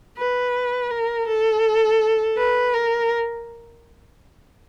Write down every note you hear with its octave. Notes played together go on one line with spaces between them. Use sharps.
B4
A#4
A4
B4
A#4